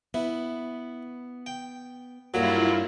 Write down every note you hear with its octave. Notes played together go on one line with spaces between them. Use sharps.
B3 E4
G5
G2 A#2 F#3 E4 F4 G4 A4